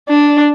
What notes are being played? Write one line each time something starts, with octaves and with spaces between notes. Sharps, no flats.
D4